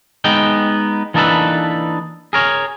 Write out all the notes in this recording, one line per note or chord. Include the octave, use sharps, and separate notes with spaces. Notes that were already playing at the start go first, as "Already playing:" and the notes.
G#3 B3 D#4 G5
E3 A#3 D4 D#4 A4 B4
G#4 A#4 C#5